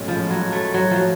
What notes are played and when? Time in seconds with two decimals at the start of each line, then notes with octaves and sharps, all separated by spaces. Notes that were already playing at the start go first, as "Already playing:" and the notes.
Already playing: B1 A2 G#3 C#4 F#4
0.08 F3
0.31 F#3
0.52 A3
0.74 F#3
0.91 F3